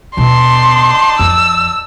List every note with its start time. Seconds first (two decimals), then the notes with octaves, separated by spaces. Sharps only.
0.17 D#2 B2 D#4 D5 A5 C6
1.19 F2 E6